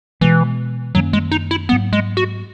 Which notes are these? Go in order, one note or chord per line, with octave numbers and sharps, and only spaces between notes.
B2 E3 G#3 B3
F#2 D#3 F#3 A#3 C#4
G#3
D#4
E4
G#2 F#3 A#3 B3
G#3
F#4